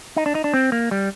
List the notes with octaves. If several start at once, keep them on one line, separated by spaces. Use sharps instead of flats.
D#4
D4
D#4
D4
C4
A#3
G3